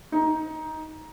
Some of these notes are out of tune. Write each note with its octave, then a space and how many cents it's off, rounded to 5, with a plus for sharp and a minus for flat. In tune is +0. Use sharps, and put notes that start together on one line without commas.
D#4 +10